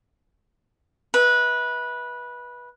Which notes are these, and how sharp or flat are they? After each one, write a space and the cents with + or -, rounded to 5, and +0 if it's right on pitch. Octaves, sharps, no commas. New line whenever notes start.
B4 -15 E5 -30